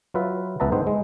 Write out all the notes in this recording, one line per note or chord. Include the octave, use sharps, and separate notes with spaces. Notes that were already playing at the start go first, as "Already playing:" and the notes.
F#3 F4 B4 E5
C#2 B3 B4 E5 A5 A#5
G#2 B3 D#4 B4 C5 G5
G#3